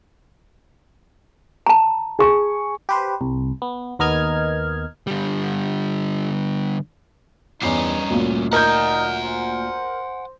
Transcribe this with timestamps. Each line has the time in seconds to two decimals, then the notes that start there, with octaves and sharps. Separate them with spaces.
1.67 A5 A#5
2.19 G#4 C#6
2.89 G4 B4 C5
3.21 C2
3.62 B3
3.99 D#2 B3 A#4 D#5 F6 G#6
5.07 D3 G3
7.62 E2 G2 C#4 D#4 C7
8.10 D2 A#2
8.53 D#4 A#4 F#5 G#5 G6
9.24 C5